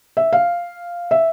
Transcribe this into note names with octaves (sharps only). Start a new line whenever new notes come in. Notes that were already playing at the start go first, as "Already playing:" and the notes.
E5
F5
E5